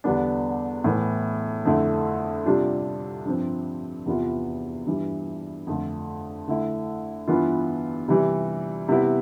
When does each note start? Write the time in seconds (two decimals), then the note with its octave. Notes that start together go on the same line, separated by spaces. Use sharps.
0.04 E2 D3 G3 B3 D4
0.84 A2 E3 B3
1.65 F2 D3 A3 E4
2.45 C3 G3 D4 F4
3.25 G2 F3 C4
4.06 E2 C3 E3 B3 F4
4.87 G2 E3 G3
5.67 F2 D3 A3
6.48 D3 A3 E4
7.28 G2 E3 B3 F4
8.08 C3 E3 G3
8.89 C3 G3 B3 E4